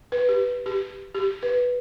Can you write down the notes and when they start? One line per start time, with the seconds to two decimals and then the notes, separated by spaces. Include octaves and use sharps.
0.12 B4
0.29 G4
0.66 G4
1.15 G4
1.43 B4